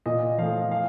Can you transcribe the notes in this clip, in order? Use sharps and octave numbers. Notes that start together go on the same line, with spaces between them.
A#2 D#5
F3 A3 F5
F5